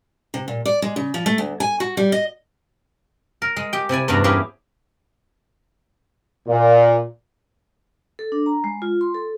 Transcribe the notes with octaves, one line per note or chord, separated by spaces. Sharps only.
C3
A#2
D5
G#3
C#3
F3
A3
D2
G#5
F#4
G3
D#5
A#4
G#3
G4 G5
C3 E4 D5 G#5
E2 G2 C#4 D4 F#4 A#5
A#3 C#4 E4 G4 G#4
A#2
A4
D4
A#5
G#3
F4
C6
A4